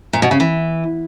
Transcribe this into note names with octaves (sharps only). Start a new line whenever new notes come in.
A#2
B2
C#3
E3